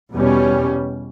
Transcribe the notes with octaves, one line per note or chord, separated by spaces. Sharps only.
E2 B2 G3 C#4